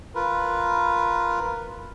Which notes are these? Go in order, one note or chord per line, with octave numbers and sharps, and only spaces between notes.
F4 A#4 B4